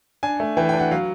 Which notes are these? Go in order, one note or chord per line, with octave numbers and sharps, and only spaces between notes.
D4 G#5
A3
E3 G5
G5
D4
F#5
F#3 F5